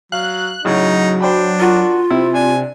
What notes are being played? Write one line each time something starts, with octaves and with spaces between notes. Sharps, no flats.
F#3 F5 F#6
A2 C#3 F#3 D#4
D4 C5 G5 B5
F4 F#4 A#4
C3 E4
D4 G#5